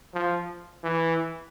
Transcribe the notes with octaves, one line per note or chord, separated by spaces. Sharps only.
F3
E3